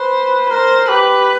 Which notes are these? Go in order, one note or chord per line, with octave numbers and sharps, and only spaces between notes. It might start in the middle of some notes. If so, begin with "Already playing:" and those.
Already playing: B4 C5
A#4 C5
G4 B4